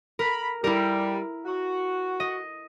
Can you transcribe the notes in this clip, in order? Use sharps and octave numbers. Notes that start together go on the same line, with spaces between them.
A#4 B5
G3 E4 A#4
F#4
D#5